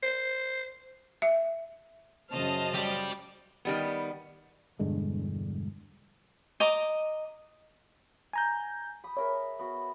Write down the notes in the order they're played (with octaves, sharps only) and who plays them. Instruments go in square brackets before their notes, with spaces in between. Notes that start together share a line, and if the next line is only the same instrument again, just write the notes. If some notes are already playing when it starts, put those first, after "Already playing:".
[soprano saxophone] C5
[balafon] E5
[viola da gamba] F#2 C#3 C5 [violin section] D#5 A5 F6
[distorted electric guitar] G4 D5
[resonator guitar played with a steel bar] D#3 G3 B3
[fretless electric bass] E1 G2 D3 G#3
[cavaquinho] D#5 A#5 D6
[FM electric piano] G#5 A#5 G6
[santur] B5 D#6
[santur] G#4 A#4 E5 [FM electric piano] C#5
[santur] B3 F#4